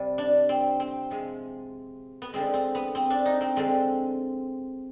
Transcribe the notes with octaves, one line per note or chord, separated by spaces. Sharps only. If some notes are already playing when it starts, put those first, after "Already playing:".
Already playing: C3 G3
D4
C4
C4
C3 F3 G#3
B3
D3 F3 G#3 C4
C4
B3
C4
D4
D#4
C4
D3 F3 G#3 C4